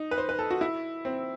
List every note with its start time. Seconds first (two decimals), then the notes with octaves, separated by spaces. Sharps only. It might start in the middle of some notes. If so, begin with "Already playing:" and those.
Already playing: D#4
0.11 B4
0.18 C5
0.29 B4
0.39 A4
0.51 F#4
0.61 E4
1.05 C4